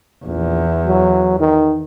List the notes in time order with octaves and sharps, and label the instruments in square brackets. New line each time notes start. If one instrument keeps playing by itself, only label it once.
[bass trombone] A#1 [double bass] E2
[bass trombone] F#3
D#3